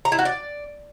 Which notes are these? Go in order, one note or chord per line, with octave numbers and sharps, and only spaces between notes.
A#5
E4
F#4
D5